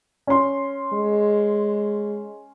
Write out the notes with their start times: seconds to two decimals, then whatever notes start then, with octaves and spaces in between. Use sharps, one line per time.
0.27 C#4 C6
0.93 G#3